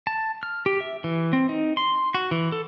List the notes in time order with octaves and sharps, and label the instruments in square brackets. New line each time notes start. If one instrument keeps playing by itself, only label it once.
[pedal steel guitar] A5
F6
G4
E5
E3
C4
D#4
C6
F#4
E3
A4